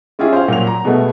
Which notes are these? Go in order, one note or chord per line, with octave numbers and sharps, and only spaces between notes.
G#3 C#4 E4 F4 G4 G#4
C5 F5
A#2 F#3 F7
A#5
B2 G#3 A3 B3